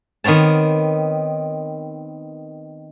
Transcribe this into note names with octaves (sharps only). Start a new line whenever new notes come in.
D#3 B3 C4 C#5 A5